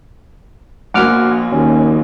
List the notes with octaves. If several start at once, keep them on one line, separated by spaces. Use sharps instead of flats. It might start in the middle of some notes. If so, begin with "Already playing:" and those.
A#1 B2 A#3 F#5 D6 F6
D#2 C#4